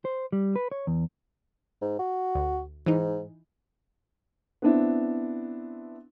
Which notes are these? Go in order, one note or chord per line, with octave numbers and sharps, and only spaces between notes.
C5
G3
B4
C#5
E2
G#2
F#4
D2
G#2 E3 D#4
B3 C4 D4 E4